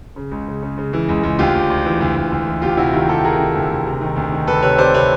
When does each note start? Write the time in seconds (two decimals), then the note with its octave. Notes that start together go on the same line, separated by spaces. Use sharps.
0.16 C#3
0.31 C#2
0.47 C#3
0.62 C#3
0.77 C#3
0.93 E3
1.08 C#2
1.23 C#2
1.39 D2 F4 G4
1.55 D2
1.70 D2
1.86 E3
2.01 D2
2.16 D2
2.32 D2
2.47 E3
2.62 D2 F4 G4
2.77 C3 E4 F#4
2.93 D#3 F4 G4
3.09 D2 G4 A4
3.24 D2 G#4 A#4
3.39 D#3
3.55 D2
3.70 D2
3.86 C3
4.01 D#3
4.16 D2
4.32 D#3
4.47 D2 A4 B4
4.62 C3 B4 C#5
4.78 C3 C5 D5
4.94 C3 B4 C#5